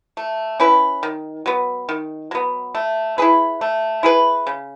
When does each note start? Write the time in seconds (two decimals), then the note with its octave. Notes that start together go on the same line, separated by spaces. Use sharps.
0.17 A3
0.60 C#4 E4 B4
1.03 D#3
1.46 F#3 B3
1.89 D#3
2.31 F#3 B3
2.75 A3
3.18 E4 G#4 B4
3.61 A3
4.03 E4 G#4 B4
4.47 C#3